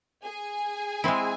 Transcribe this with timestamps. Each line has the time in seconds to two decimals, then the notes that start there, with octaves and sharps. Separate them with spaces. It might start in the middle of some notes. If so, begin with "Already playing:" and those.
0.24 G#4 G#5
1.04 G#3 C4 E4